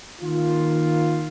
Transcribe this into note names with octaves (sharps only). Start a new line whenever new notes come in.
D#3 A#3 F4